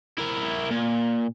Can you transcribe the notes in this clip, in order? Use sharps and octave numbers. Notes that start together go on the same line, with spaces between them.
E4 A#4
A#2